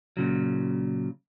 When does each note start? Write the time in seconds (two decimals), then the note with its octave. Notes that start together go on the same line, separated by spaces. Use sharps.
0.17 A#2 C#3 F#3